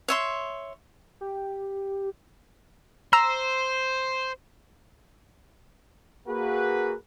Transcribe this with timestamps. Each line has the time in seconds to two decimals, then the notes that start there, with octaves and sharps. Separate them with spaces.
0.08 C#5 E5 C6
1.21 G4
3.13 C5 A#5 E6
6.28 A#3 F#4 G#4 B4